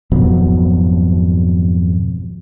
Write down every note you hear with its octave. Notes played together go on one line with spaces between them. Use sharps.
G#1 F2 B2 F#3